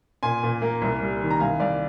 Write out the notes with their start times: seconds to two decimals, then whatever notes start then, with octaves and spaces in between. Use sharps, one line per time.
0.23 A#2 G#5 C6
0.43 A#2
0.62 A#3
0.82 C2
1.01 G3
1.22 D#3
1.30 A#5
1.40 C2 F5 G#5
1.60 C2 D5 F5